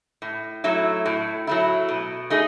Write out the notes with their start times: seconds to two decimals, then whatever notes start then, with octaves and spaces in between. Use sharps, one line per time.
0.22 A2
0.64 F#3 A3 E4
1.06 A2
1.47 F#3 A3 E4
1.89 B2
2.30 A3 D#4 G#4